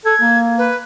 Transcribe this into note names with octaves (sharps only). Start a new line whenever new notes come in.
A4 G#6
A#3
B4